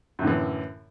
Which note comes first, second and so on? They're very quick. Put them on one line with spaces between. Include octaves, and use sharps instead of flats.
F#2 A2 D3 E3